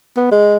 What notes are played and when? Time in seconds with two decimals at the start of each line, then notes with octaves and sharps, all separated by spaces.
0.17 B3
0.31 G#3